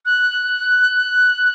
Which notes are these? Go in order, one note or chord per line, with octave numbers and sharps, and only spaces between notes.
F#6